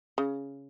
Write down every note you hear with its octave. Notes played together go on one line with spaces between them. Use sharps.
C#3